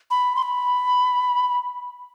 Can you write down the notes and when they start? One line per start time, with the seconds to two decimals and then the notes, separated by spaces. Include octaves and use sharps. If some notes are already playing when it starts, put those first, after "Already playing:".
0.11 B5
0.36 C6
0.43 B5